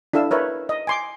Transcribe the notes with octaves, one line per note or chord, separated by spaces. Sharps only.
D4 E4 A4 F5 E6
A#4 B4 C#5 E5
D#5
G#5 C6 D6